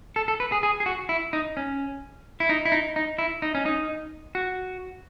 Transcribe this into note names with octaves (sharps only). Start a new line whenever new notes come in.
A4
A4
B4
G#4
G#4
G#4
F#4
E4
D#4
C#4
E4
D#4
E4
D#4
D#4
E4
D#4
C#4
D#4
F#4